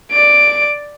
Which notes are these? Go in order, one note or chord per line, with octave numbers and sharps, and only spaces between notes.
D5 D7